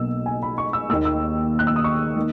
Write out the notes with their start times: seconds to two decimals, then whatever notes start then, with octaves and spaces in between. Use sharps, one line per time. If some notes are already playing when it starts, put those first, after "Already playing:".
Already playing: B1 B2 A#3 E6
0.26 G#5
0.43 B5
0.58 C#6
0.73 E6
0.90 D#2 D#3 A#3 E6
1.05 E6
1.59 F#6
1.67 E6
1.76 D#6
1.84 C#6
2.16 D#3 A#3